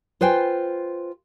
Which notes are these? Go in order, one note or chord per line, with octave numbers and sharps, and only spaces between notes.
F4 B4 C5 G5 G#5